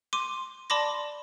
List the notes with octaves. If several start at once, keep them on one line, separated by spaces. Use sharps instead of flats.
C6 D6 D#7
D5 A5 B5 C6 D6 A#6